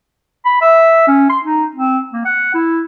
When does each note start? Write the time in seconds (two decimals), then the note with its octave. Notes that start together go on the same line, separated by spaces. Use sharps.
0.45 B5
0.61 E5
1.07 C#4
1.30 C6
1.44 D#4
1.75 C4
2.13 A#3
2.25 F#5
2.54 E4